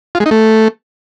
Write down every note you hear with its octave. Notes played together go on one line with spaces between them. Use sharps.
F4
G#3
D#4
A3